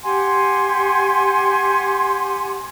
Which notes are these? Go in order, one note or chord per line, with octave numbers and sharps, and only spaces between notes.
G4 F#5 G#5 C6